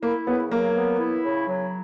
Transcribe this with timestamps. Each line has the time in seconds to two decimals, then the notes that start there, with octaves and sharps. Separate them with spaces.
0.02 A#3 E4
0.27 C#3 B3
0.50 F#3 A#3
0.75 B3
1.00 E4
1.24 C#3
1.48 F#3